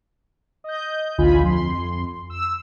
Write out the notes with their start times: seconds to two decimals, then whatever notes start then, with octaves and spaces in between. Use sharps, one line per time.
0.64 D#5 G6
1.18 A1 D2 D3 F4 G#5 B5
1.42 F2 C6
2.30 E6